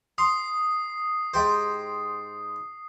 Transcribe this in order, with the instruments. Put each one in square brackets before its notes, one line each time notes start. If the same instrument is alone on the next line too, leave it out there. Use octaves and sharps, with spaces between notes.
[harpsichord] C6 [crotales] D#6 C7
[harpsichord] G#2 G4 C5